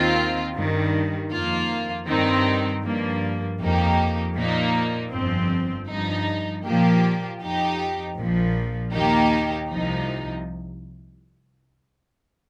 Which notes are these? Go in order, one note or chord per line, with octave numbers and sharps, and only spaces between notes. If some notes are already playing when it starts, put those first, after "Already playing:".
Already playing: D#2 D#3 C4 F4
G2 D#3 G3
F2 D#3 A#3 F4
G2 D#3 C4 D#4
G2 F3 A#3
F2 F3 A#3 D#4 G4
A#2 F3 A#3 D#4
G1 F2 F3 C4
G2 F3 D#4
A#2 F3 A#3 G4
F2 F3 D#4 G4
A#1 A#2 F3
D#2 D#3 A#3 D#4 G4
C2 C3 F3 D#4